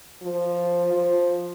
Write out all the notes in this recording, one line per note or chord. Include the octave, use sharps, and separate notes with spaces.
F3
F3